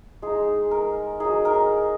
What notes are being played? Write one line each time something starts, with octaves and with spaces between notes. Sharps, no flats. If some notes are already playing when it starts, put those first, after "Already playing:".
G#3 D#4 G#4
A#4
F#3 D#4 G#4
A#4